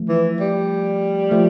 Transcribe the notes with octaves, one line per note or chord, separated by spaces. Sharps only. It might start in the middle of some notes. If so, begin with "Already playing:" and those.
Already playing: F3 A3
E3
G3
F3 A3